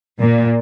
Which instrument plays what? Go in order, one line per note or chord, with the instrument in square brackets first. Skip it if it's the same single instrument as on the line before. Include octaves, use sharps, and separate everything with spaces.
[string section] A#2